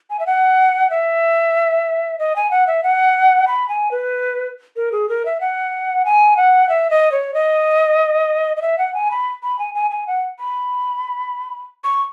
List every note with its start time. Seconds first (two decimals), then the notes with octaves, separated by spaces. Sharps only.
0.10 G#5
0.19 E5
0.26 F#5
0.90 E5
2.19 D#5
2.36 G#5
2.51 F#5
2.67 E5
2.83 F#5
3.47 B5
3.69 G#5
3.91 B4
4.76 A#4
4.92 G#4
5.09 A#4
5.25 E5
5.41 F#5
6.05 G#5
6.37 F#5
6.69 E5
6.90 D#5
7.12 C#5
7.34 D#5
8.57 D#5
8.62 E5
8.78 F#5
8.94 G#5
9.11 B5
9.43 B5
9.59 G#5
9.75 G#5
9.91 G#5
10.07 F#5
10.39 B5
11.84 C#6